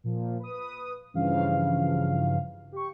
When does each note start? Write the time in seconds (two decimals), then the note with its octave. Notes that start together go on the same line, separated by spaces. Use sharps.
0.04 A#2 F3
0.39 B4 D#6
1.14 G2 C#3 E3 F3 F5
2.72 G4 C#6